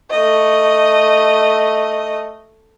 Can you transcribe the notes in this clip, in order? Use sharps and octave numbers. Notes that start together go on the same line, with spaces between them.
A3 D#5